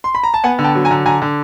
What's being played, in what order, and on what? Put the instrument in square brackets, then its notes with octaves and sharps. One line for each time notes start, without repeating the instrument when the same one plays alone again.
[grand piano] C6
B5
A#5
A5
B3 F#5 G#5
D3
G5 A5
F#3
G#5 A#5
D3
D3 G#5 A#5
D3